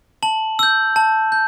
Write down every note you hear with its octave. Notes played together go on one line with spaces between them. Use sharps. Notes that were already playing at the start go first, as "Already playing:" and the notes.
A5 F#7
E6 G6
A5
G6